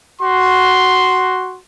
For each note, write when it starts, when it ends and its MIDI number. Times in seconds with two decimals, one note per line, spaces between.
0.21 1.57 66
0.21 1.57 84